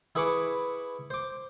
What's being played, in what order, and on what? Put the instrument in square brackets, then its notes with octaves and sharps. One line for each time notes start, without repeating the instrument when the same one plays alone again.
[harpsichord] E4 G#4 B4 B5 C#6 D6
C5 D6